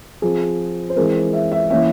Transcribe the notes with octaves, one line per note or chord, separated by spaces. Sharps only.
F3 C4 G#4
C5
E3 G#3 C4 A#4
E5
E5
E3 A#3 C#4 E5